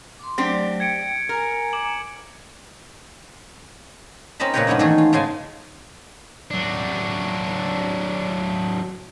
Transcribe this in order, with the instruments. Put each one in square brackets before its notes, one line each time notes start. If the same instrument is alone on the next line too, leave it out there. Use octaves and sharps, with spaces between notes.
[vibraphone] C6 D6
[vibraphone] F#3 A3 D5 [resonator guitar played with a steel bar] C4 D4 G4
[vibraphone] G5 [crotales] G#6 C#7 D7
[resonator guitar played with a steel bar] A#4 [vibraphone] G#5 A#5
[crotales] D6 F#7
[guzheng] C4 C#4 A#4 D#5 A5 B5
A#2 C#3 A#4 B4 C#5 G5
G2 B3 C#4 D#4 E4
D#3 E3 A3 G#4 A4
F4
G#2 C#3 G#3 G#5 A5
[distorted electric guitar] F#3 D4